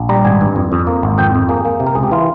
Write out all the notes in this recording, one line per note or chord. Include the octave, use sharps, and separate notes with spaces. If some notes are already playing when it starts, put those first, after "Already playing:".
Already playing: A#1
G3 A#5
G#1 G#5
G2
F2
F2
A#3
G#1
F2 G5
F2
A#3 G#4
A#3
C3
A#4
C#2 G#4
G4
E3 F4